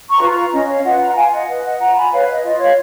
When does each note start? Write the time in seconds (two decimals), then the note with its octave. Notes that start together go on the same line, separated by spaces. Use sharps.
0.09 A#5 C#6
0.20 F4 B4
0.31 A#5 C#6
0.52 C#4 D#5
0.68 C#5 F5
0.84 F4 B4 D#5 F#5
1.00 F#5 A#5
1.16 F4 F5 G#5
1.32 D#5 F#5
1.48 B4 D#5
1.64 D#5 F#5
1.79 F4 F#5 A#5
1.95 G#5 B5
2.12 B4 C#5 F5
2.28 D#5
2.44 F4 D#5
2.60 C#5 F5